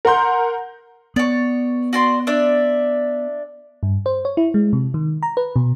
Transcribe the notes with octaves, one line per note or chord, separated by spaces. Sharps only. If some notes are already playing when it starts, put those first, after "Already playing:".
A#4 F#5 C6 G6
B3 C#5 D5
F#4 D5 C6
D4 D5 E5
G2
C5
C#5
E4
G#3
C3
D#3
A#5
B4
B2